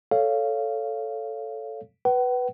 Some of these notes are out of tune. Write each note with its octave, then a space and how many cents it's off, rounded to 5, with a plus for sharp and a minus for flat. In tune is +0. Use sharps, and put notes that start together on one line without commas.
A4 +0 C#5 +10 F5 -10
B4 +0 F#5 +45